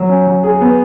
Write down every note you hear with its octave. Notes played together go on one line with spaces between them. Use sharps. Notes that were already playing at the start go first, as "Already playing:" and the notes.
Already playing: F#3
C#4
F#3
G#4
B3